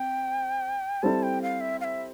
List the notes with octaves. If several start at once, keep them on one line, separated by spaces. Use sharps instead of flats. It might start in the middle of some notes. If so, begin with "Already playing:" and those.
Already playing: C4 G5
G3 C4 E4 A4 A5
G5
F5
E5
F5
E5